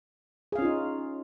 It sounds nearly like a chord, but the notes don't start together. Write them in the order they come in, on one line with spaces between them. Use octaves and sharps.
G#4 F5 C#4 F4 D#4